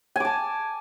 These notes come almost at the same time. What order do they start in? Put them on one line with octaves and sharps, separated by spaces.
G#5 D6 A5